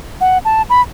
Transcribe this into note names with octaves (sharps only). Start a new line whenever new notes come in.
F#5
A5
B5